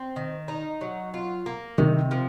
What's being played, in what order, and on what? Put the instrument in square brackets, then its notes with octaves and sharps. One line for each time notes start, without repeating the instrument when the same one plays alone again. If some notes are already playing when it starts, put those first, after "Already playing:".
Already playing: [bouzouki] C4
D#3
D#4
F#3
F4
A#3
[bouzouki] C3 [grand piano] D#3
[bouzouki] F3